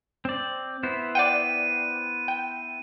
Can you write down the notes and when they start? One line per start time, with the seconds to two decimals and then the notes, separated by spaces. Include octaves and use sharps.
0.25 C4 D5
0.83 B3 E4 C5
1.15 D5 F#5 G5 D#7
2.28 G5